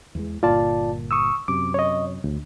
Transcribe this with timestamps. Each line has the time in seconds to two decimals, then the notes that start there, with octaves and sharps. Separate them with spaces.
0.15 E2 E3 G#3
0.43 G1 A#2 F4 D5 A5
1.11 C#6 D#6 E6
1.48 F#2 C3 D6
1.74 C#5 D#5
2.24 D2